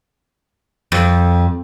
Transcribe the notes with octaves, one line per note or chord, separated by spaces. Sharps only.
F2